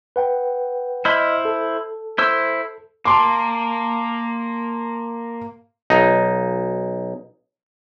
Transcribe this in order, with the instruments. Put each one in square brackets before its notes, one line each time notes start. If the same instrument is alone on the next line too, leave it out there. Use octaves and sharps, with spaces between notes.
[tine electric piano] B4 F#5 G5
[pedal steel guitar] E4 C5 B5 [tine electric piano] D#5 E6 F6
[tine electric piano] A4
[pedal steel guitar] E4 C5 E6
[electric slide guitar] A#3 [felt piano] A5 C6 D6
[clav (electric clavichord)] B1 D#4